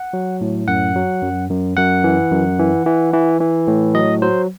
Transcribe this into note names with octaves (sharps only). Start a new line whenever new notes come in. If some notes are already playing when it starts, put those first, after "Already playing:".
Already playing: F#5
F#3
A2
F#2 F#5
F#3
F#2
F#2
F#2 F#5
E3
F#2
E3
E3
E3
E3
A2
F#3 D#5
F#3 C5